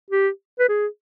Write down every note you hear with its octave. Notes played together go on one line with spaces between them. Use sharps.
G4
B4
G#4